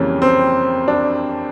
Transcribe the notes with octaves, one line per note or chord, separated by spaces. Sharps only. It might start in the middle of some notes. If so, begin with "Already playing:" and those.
Already playing: F2 C#3 E3 G3 A#3 C#4
C4
D4